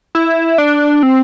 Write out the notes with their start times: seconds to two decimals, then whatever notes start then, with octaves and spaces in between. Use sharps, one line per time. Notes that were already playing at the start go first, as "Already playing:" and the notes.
0.15 E4
0.58 D4
1.03 C4